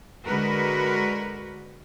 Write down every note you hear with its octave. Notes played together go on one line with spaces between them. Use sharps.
D3 G#3 F#4 A#4 B4